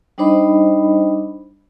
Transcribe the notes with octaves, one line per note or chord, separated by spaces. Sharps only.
G3 D4 D#4 C5 D#5 B5